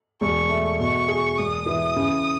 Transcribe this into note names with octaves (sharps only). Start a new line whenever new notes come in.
E1 C#6
A3
B2 C#6
G#4
E1 D#6
E3
C#3